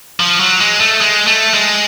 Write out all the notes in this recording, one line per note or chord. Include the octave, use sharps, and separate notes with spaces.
F3
F#3
G#3
A3
G#3
A3
G#3